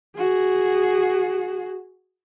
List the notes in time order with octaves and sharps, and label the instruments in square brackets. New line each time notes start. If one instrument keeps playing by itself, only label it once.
[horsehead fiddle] F#4 G#4